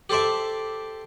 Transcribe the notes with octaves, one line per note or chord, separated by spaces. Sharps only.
G4 A4 C5 D5 E5